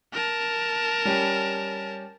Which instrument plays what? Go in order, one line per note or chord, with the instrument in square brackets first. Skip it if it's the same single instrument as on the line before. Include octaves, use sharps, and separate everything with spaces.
[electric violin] A#4 A5
[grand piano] G3 C#4 G4